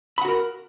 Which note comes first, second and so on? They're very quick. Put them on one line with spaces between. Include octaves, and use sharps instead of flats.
B5 F#5 F#4 A#4